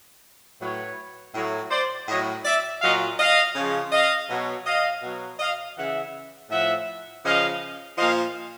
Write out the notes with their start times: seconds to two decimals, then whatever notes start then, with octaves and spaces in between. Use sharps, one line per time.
0.60 A2 F#3 B4 C#5
1.34 A2 F#3
1.71 C5 D5
2.08 A2 F#3 C#5 D#5
2.45 D5 E5
2.81 A#2 F#3 D#5 F5
3.18 D#5 F5
3.55 C#3 F3
3.92 D#5 F5
4.29 B2 F#3
4.65 D#5 F5
5.02 B2 F#3
5.39 D#5 F5
5.76 C#3 E3 E5 F#5
6.50 A2 F3 E5 F#5
7.24 C#3 F3 D#5 F5
7.97 A#2 F3 D#5 F5